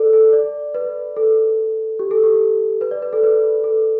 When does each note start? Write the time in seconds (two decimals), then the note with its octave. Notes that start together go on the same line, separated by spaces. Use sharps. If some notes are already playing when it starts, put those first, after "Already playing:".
Already playing: A4 D5
0.13 A4
0.33 D5
0.75 B4
1.16 A4
1.99 G4
2.11 A4
2.24 G4
2.81 B4
2.91 D5
3.02 B4
3.13 A4
3.23 B4
3.64 A4